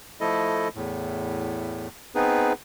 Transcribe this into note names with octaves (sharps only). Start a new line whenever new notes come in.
F3 A3 E4 A4 D#5
E2 A2
B3 C4 D#4 G#4 B4